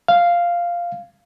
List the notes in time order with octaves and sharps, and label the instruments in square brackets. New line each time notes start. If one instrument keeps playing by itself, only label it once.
[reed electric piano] F5